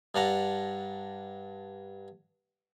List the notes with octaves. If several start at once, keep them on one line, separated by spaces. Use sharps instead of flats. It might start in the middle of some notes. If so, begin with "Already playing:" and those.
G2 D4 F#5 A#5